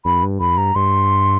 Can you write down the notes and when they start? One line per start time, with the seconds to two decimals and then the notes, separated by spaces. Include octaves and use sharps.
0.05 F2 B5
0.23 G2
0.40 F2 B5
0.57 G2 A#5
0.75 G2 C6